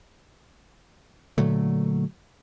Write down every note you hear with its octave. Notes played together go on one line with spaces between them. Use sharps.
A#2 D3 F#3 A3